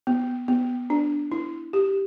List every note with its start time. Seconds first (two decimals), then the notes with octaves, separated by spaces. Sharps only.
0.07 B3
0.48 B3
0.90 D4
1.32 E4
1.73 G4